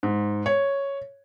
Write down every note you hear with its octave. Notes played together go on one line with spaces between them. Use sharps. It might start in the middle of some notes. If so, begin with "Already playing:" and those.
G#2
C#5